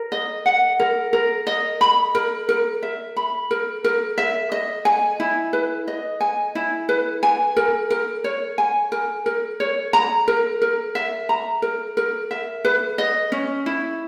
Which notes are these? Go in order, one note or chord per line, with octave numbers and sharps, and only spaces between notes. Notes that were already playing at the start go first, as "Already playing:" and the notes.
Already playing: A#4
D#5
F#5
A#4
A#4
D#5
B5
A#4
A#4
E5
B5
A#4
A#4
E5
D#5
G#5
E4
B4
D#5
G#5
E4
B4
G#5
A#4
A#4
C#5
G#5
A#4
A#4
C#5
A#5
A#4
A#4
E5
A#5
A#4
A#4
E5
B4
D#5
C#4
E4